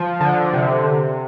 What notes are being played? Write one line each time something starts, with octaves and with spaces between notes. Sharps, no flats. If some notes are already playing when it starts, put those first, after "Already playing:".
Already playing: F3
D3
C3